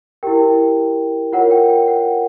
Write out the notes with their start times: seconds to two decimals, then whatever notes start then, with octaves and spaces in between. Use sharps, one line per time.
0.23 E4 G4 A#4 G5
1.32 F4 A#4 C#5 F#5
1.51 G5
1.69 G5
1.88 F#5